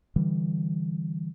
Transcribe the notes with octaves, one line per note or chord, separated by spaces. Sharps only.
D3 E3 G3